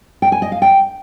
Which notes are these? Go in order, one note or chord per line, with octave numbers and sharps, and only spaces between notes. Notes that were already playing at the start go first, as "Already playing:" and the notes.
G5
G#5
D#5
F5
G5